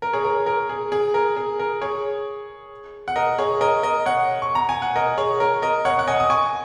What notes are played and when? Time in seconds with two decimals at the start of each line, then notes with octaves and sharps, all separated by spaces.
0.02 A#4
0.13 G#4 C#5
0.24 A#4
0.46 A#4
0.69 G#4
0.92 G#4
1.14 A#4
1.36 G#4
1.59 A#4
1.81 G#4 C#5
3.08 F#5
3.16 A#4 D#5
3.38 G#4 C#5
3.61 A#4 D#5
3.83 A#4 D#5
4.06 C#5 F#5
4.42 C#6
4.55 A#5
4.69 G#5
4.82 F#5
4.96 A#4 D#5
5.18 G#4 C#5
5.40 A#4
5.62 A#4 D#5
5.85 C#5 F#5
5.99 F#5
6.08 D#5 G#5
6.20 D#6
6.30 G#5 C#6